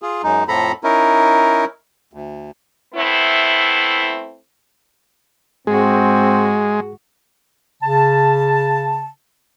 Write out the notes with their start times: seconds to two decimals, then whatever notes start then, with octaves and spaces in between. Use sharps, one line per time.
0.02 F4 G#4
0.24 F#2 G#3 D#4
0.48 F2 A2 F3 A4 A#5 B5
0.84 C#4 D#4 E4 A#4
2.13 D2
2.94 A3 B3 C4 E4
5.67 G#2 G#3 C4 F#4 G#4
7.82 C#3 A5